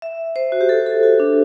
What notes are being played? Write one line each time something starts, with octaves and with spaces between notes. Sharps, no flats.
E5
C5
F#4
G4
A4
A4
F#4
D4